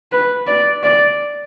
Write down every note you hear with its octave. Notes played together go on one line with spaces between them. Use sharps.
B4
D5
D5